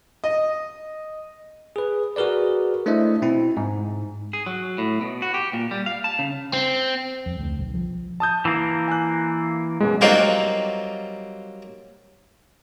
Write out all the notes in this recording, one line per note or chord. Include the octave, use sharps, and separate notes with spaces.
D#5
G#4 B4
F#4 G#4 A#4 B4 D5
A3 D4 E4 C5 D#5 E5
B2 C4 E4
G#2
G#4
F#3
A2
B2
F#4
G4
A#2
G3
F5
A5
C#3
C4
F2
D2
B1
F3
A5 D#6 G6
E3 A#3
G#5 F#6
F#2 B2 G#3
F#3 G3 A#3 C4 D#4 F4